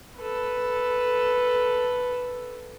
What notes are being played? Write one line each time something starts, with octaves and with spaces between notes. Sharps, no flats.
A4 B4